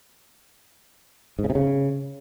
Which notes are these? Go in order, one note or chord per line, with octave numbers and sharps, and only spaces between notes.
G#2
C#3
C3
C#3